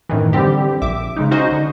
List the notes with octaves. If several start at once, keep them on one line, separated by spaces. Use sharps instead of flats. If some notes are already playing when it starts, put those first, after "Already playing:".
F#2 A2 D#3 E3
D3 G3 C4 G4
A#1 E5 D6
C#3 G#3 D#4
C#4 D#4 F#4 C5 D#5
D3